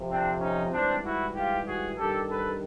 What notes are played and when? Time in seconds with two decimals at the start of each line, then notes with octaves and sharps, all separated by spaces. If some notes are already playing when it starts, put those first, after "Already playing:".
Already playing: F2 C3 F3
0.09 C4 D4
0.40 C#4 D#4
0.72 G#2 E3 G3 C4 D4
1.03 E4 F#4
1.35 F4 G4
1.66 F#4 G#4
1.97 G2 D#3 G3 G4 A4
2.28 A4 B4